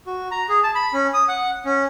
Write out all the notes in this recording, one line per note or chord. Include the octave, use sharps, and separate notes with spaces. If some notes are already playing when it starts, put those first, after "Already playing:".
F#4
A#5
G#4
A5
B5
C#4
D#6
F#5
C#4